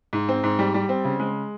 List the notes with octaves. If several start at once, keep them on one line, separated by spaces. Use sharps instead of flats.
G#2
C4
G#2
G3
G3
C4
C#3
G#3